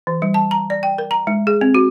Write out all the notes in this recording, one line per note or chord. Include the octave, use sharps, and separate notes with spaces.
E3
G3
A5
A#5
D5
G5
A#4
A#5
G#3
G#4
C4
F#4